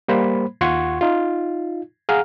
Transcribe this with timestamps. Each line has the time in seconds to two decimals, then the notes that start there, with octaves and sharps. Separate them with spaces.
0.08 G3 A#3 C5 B5
0.61 D#2 F4 F#5 C6 C#6 G#6
1.01 D#4 F4
2.09 G#4 F5 F#5 A#5 F6